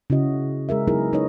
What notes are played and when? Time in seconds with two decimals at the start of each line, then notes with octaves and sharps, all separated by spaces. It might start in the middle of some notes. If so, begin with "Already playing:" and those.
0.10 C#3 C#4 E4 F#4 D#5
0.69 G#3 G#4 A#4 E5
0.88 F#3 B3 D#4 E4 G#4 A#4
1.12 C#4 D#4 B4 C#5 D#5